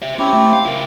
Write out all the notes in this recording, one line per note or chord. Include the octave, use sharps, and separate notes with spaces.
C5 E5
C4 C#4 E4 G4
A3
F5
E4 A#4